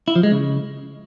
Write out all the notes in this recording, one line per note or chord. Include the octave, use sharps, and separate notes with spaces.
E4
F3
G#3
C#3